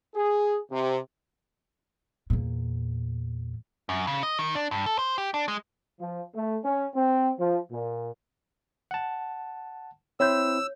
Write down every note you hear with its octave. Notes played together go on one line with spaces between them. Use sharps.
G#4
C3
E2 A#2
F#2
C#3
D#5
D#3
D4
G2
A4
C5
G4
D4
G#3
F3
A3
C#4
C4
F3
A#2
F#5 A5
C4 E4 C5 C#5 E6 G6